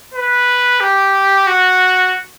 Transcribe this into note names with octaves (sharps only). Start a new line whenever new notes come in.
B4
G4
F#4